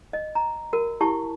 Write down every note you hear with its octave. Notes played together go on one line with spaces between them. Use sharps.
D#5
A#5
F#4 A#4
E4 G4 A5 C#6